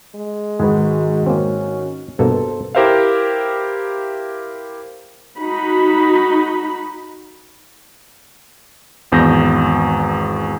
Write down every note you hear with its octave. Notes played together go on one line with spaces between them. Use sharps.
G#3
G#2 D#3 F#4 G#4 B4
G#2 A#3 C4 C#4
G2 B2 A#3 A4 C5
E4 G4 A#4 C5 E5 F5
D#4 F#4 B5
G#1 E2 G6 A#6